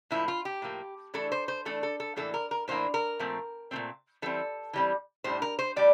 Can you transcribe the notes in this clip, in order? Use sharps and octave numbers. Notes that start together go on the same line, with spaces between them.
A2 F3 A#3 E4
F4
G4
A2 F3 A#3
E3 A3 D4 A4
C5
C5
E3 A3 D4 A4
A4
A4
A2 E3 A#3 D4 A4
A#4
A#4
A2 E3 A#3 D4 C5
A#4
A#2 F3 A3 C4
A#2 F3 A3 C4
E3 G3 C4 A4
E3 G3 C4
A2 G3 D4 C5
A#4
C5
A2 G3 D5